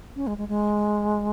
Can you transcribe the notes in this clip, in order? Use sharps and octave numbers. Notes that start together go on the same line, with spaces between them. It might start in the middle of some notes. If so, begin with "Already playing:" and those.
C#4
G#3
G#3
G#3